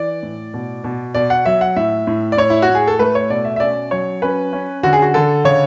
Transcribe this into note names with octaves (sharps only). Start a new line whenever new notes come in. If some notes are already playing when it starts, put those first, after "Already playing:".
Already playing: E3 D5
A2
B2
B2
B2 D5
F#5
F#3 E5
F#5
A2 E5
A2
D5
A2 C#5
E4
F#4
A2
G#4
A4
A3 B4
C#5
B2 D5
E5
E5
C#4 D5
F#3 C#5
C#4 B4
C#4
D3 F#4
G#4
F#4
D3 A4
C#3 C#5